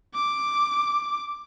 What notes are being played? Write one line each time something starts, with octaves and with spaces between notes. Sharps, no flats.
D6